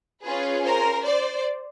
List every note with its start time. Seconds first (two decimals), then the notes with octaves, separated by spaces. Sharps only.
0.24 C#4 F4 G#4 B4
0.64 A#4 C5
1.04 C5 D5